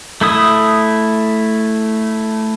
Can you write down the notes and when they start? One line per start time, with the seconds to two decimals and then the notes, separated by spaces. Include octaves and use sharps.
0.21 A3 E4 D#6